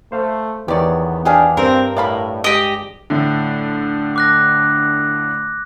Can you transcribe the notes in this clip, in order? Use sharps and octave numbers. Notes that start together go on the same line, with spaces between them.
A3 C5 F5
E2 D#3 B3 G4 C#5 D5
D4 G4 G#4 F5
G2 C4 A#4
A2 D5 F5 B5
G#3 G4 D#5
A2 D3
D6 F#6 A#6